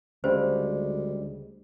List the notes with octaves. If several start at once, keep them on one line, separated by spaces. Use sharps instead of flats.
D2 C#3 G3 G#3 C5